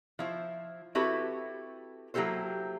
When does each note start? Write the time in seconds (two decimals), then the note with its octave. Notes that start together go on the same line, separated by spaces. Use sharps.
0.19 F3 E4 C5
0.95 C4 E4 F#4 G4 A4 B4
2.14 F#3 A#3 E4 G4 A4 C5